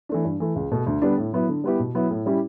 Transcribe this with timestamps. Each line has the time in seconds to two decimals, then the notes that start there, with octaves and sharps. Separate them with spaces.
0.09 E3 A3 D4
0.24 G2
0.40 E3 A3
0.56 C#2
0.71 B2 A3
0.87 D2
1.02 D3 G3 B3 D4
1.18 A2
1.33 F#3 B3 E4
1.49 D3
1.64 G3 B3 E4 G4
1.79 B2
1.95 F#3 B3 E4
2.11 A2
2.26 G3 C#4 E4 G4